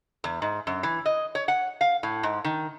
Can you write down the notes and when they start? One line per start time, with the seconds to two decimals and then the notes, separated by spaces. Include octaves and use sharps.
0.24 E2
0.42 G#2
0.67 F#2
0.83 E3
1.06 D#5
1.35 C#5
1.48 F#5
1.81 F5
2.03 A2
2.23 G#2
2.45 D#3